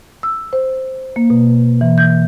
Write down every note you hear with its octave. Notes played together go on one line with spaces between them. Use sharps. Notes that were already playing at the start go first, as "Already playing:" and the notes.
E6
C5
A#3
B2
E3
G6